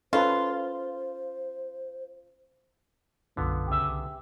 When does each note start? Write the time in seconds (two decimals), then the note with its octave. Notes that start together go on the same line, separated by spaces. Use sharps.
0.13 C#4 F4 A4 B4 C5
3.37 B1 F#2 D3 B3 F4
3.68 C2 C#3 G4 E5 G#5